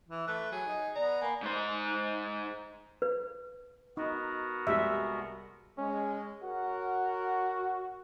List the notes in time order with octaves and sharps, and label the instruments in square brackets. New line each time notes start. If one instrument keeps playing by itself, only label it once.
[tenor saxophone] E3
[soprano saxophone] A3 [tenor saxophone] B4 [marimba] F#6
[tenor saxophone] F#3 [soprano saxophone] G#4
[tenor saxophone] D#4
[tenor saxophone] B3 [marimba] D5 [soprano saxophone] A#5
[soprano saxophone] A#3 [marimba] G#5 B5
[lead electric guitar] G#2 C5
[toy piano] B4
[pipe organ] B3 F#4 A#4 [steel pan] D#4
[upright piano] C2 G3 G#3 [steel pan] E5
[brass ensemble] G#3 [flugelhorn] C#4
[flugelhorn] F#4 [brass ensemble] A#4 C#5 F#5